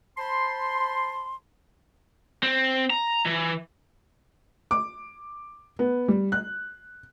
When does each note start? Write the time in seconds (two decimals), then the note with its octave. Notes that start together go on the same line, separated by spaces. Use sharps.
0.18 C5 A5 B5 C6
2.43 C4
2.90 A#5
3.26 E3
4.71 D6
5.79 B3
6.08 G3
6.32 F#6